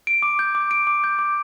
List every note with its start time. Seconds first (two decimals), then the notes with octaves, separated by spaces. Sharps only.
0.07 D7
0.22 D6
0.39 G6
0.55 D6
0.71 D7
0.87 D6
1.04 G6
1.19 D6